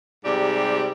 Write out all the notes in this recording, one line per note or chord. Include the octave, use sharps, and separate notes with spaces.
G#2 C3 G3 D5